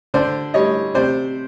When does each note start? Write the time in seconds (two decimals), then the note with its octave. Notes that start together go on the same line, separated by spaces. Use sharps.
0.14 D3 C5 D5
0.54 G3 C#5 D#5
0.94 C3 C5 D5